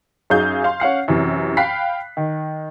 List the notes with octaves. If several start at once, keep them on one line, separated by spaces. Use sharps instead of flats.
F#2 F#3 D#4 G#4 F5 G6
F5 C6
C#4 F5 F#5 C7
F#2 C3 E3
F5 G5 B5 F#6 B6 C7
D#3